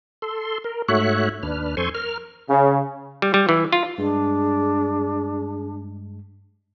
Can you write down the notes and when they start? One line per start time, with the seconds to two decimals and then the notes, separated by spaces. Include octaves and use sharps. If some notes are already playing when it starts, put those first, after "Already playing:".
0.22 A4 C6
0.64 A#4
0.88 G#2 A3 F#4 C#5 E5 F#6
1.43 D#2 D4 B4 F6
1.77 F2 A4 C5 G#5 C6 C#6
1.95 A#4 F6
2.50 C#3
3.22 G3
3.34 G3
3.49 E3
3.72 F4
3.98 G2 G#3 D4 G#4